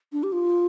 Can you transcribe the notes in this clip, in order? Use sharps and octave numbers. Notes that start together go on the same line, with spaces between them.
D4
G4
F4